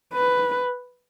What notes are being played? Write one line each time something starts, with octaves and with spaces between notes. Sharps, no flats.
B4